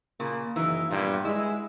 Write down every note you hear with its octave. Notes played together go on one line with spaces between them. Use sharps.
A#2 C#3 A#3
F#1 E3 D#4
G2 A#2 G3 B3
G#3 E4